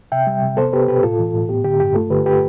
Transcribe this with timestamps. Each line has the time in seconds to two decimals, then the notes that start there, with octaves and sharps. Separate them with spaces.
0.12 C3 E5 G5
0.27 G3
0.42 C3
0.57 B3 A4 C5
0.73 B3 G4 B4
0.88 B2 G4 B4
1.03 A2 F4 A4
1.19 E3
1.34 A2
1.49 B3 G4
1.64 D3 G4
1.80 G2 G4
1.95 A3 F4 A4
2.10 D3 G4 B4
2.26 G4 B4